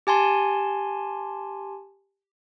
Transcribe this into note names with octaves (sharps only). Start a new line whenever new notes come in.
G4 G#5 A5 C6